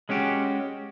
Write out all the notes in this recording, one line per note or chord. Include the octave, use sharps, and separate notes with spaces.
G#3 C#4 F#4 G4